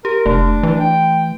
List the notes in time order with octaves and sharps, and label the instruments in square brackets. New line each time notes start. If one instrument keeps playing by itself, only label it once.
[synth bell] G4 [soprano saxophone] A#4
[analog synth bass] F1 [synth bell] A3 [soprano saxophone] D4
[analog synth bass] E3
[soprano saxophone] G5